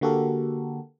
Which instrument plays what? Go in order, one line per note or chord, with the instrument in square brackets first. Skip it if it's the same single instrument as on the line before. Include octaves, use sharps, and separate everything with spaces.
[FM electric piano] D3 A#3 F#4 G4 A4 A#4